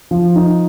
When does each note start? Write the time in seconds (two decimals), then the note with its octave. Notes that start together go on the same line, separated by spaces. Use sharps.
0.11 F3
0.36 D#4